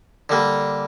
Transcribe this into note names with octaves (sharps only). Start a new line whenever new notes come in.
D3 G3 A#3